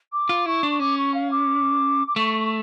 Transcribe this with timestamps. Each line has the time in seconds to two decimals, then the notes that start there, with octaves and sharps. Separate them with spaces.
0.12 D6
0.29 F4
0.46 E4 C#6
0.63 D4
0.70 C#6
0.80 C#4 D6
0.97 C#6
1.14 F5
1.31 D6
2.07 D6
2.16 A3 C#6
2.40 C#6